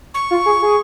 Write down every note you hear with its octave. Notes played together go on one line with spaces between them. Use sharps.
C#6
F4
G#4
G#4